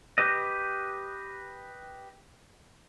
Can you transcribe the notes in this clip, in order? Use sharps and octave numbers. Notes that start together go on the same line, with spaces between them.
G4 B4 D#5